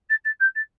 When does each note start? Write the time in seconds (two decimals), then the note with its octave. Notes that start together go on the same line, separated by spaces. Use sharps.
0.09 A6
0.24 A6
0.40 G6
0.55 A6